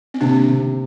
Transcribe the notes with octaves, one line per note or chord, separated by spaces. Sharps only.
C4
C3 A#3 D4
C3